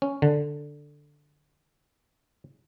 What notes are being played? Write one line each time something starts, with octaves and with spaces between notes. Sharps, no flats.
C#4
D3